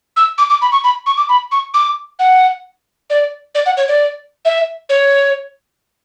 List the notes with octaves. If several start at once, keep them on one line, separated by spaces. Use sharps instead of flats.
E6
D6
D6
B5
C#6
B5
C#6
D6
B5
C#6
D6
F#5
D5
D5
F#5
C#5
D5
E5
C#5